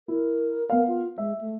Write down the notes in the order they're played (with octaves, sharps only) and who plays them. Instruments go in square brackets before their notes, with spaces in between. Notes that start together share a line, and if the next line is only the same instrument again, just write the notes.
[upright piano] E4 [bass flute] A#4
[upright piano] B3 F5 [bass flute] A#4
[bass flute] F4
[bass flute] G#3 [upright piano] E5
[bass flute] A3